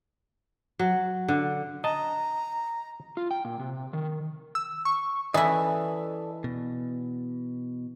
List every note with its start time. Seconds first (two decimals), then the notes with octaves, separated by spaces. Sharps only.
0.79 F#3
1.28 D3
1.84 D#5 A5 A#5
3.17 F4
3.31 G5
3.45 A#2
3.59 C3
3.93 D#3
4.55 E6
4.85 C#6
5.34 E3 E4 A4 D5 D#5
6.44 B2